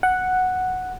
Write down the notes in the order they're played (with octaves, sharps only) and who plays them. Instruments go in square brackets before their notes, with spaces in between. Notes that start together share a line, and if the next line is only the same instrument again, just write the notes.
[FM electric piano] F#5